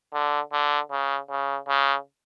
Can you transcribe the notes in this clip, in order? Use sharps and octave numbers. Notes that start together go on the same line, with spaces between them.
D3
D3
C#3
C#3
C#3